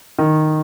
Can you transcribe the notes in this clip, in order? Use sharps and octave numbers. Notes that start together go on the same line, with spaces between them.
D#3